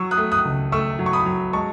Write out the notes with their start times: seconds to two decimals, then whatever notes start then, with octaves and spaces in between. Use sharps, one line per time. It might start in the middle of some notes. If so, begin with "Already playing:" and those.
Already playing: F#3 C#6 E6
0.11 D#6 F#6
0.17 A3
0.32 D#6 F#6
0.45 C#2
0.72 A3 C#6 E6
0.99 F#3
1.06 C#6
1.13 B5 D#6
1.26 F#3
1.53 G#3 A5 C#6